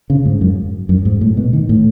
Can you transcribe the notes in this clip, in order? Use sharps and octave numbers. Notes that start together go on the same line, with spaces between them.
C#3
G#2
F#2
F#2
G#2
A2
B2
D#3
A2